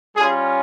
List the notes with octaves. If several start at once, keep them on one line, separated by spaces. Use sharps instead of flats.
G3 C#4 F4 G#4